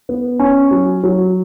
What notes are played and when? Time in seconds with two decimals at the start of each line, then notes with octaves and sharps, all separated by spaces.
0.09 B3
0.40 C#4
0.71 F#3
1.04 F#3